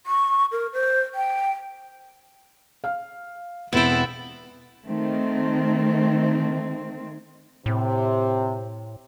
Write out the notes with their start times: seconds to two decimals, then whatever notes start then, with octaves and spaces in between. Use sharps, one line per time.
0.06 C#6
0.52 A#4
0.73 C5
1.15 G5
2.84 F5 F6
3.73 E1 B3 C4 E4 A4 G5
4.87 D#3 A3 C4
7.66 A2 C3